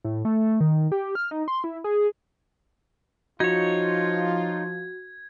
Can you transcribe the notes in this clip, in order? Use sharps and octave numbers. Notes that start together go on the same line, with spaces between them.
A2
A3
D#3
G4
F6
D#4
C6
E4
G#4
F3 D#4 F4 F#4 C#5 G#6